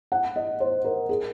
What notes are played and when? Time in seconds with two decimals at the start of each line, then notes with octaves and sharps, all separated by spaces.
0.12 F#5
0.36 D#5
0.60 C5
0.85 A#4
1.09 G#4